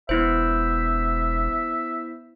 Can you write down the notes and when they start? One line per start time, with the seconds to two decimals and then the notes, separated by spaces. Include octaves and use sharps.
0.09 E1 B3 E4 C5 E5